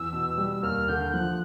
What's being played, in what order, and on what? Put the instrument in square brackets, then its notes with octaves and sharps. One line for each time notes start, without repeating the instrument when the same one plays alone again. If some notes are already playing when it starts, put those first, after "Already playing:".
Already playing: [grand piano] E2 [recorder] E6
[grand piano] B2
G3
[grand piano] D#2 [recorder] F6
[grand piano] D3 [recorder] G6
[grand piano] F3 [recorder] F#6